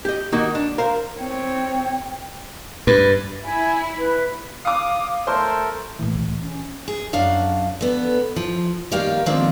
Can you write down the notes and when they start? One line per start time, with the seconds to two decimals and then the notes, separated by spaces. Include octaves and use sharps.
0.05 G4 D#5
0.32 D#3 A#3 D#4 F#4 G4
0.55 D4
0.78 A#4 C5 F5
1.19 C4 C#5 G5
2.87 G2 B4
3.44 E4 G#5
3.98 B4
4.65 F5 D6 D#6
5.27 A3 A4 A#4 C5 C6
5.99 A2 E3 A#3
6.15 C#2 A2
6.42 C#3 C#4
6.88 G#4
7.13 F#2 D4 F5 F#5
7.81 D3 B3
8.36 F3
8.91 D#3 G3 A#3 G4 F5 G5
9.26 D#3 F3 G#3 A#3 C4 D4